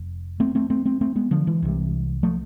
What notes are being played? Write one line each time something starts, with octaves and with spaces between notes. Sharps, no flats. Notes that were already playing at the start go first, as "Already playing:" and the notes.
Already playing: F1
A3 C4
A3 C4
A3 C4
A3 C4
A3 C4
G#3 B3
D3 F3
E3 G#3
C2 C3
F3 A3